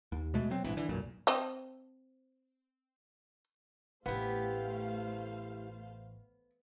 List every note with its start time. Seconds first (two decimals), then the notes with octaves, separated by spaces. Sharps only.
0.12 D#2
0.34 B2 G#3 A3
0.51 F#3 C4
0.64 A#1 G#2 E3
0.77 D3 E3
0.89 B1 F#2 A#2
1.27 C4 D#5 A5
4.06 A1 A3 B3 E4 G4 C5 F5